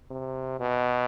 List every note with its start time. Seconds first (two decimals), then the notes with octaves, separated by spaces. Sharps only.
0.11 C3
0.60 B2